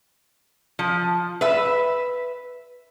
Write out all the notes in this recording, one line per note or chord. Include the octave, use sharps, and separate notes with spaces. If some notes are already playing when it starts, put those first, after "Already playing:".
F3
B4 E5